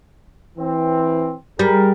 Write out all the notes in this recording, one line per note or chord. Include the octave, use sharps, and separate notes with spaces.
E3 C4
G3 G#4 A#4